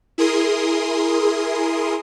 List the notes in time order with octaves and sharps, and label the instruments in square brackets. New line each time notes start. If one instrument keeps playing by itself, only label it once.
[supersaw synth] E4 G#4 A#4 C6 D#6